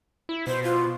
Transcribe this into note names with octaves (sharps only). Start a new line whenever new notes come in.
E4
B2 C5
F4